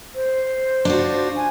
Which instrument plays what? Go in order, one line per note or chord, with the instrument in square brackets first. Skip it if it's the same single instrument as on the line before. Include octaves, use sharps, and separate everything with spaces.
[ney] C5
[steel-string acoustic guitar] D4 F4 F#4
[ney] G#5